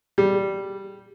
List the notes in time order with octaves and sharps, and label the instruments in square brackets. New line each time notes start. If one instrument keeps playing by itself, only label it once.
[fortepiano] G3